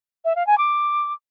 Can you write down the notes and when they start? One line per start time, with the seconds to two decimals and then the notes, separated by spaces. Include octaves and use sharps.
0.25 E5
0.36 F5
0.47 G#5
0.58 D6